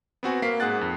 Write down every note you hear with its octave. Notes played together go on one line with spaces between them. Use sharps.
B3 C4 F#4 G#5
A#3 F5 B6 C7
G#2 G#4 F#5 F#6 A6
F2